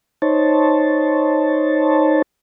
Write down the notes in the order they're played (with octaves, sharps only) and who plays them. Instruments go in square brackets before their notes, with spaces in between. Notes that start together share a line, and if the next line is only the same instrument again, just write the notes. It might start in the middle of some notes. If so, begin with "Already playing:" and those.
[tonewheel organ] D#4 C5 C#5 A5